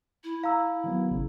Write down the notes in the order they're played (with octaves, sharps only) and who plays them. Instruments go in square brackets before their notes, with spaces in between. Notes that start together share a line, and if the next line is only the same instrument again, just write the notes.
[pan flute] E4
[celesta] F5 A#5 E6
[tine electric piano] D#3 F#3 B3
G#1 C#3